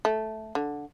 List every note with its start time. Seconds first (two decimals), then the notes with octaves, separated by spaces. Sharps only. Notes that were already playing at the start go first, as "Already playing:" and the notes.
0.05 A3
0.55 D3